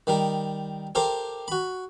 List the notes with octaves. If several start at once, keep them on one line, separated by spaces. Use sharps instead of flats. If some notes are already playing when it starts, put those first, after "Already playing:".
D#3 G3 A#4
G4 A4 A#4 C5 F5
F#4 B5